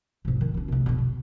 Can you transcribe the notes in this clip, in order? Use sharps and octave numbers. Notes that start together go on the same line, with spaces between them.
G#2 B2
D#3
C#4 D4
D2 C3
E2 B2
B2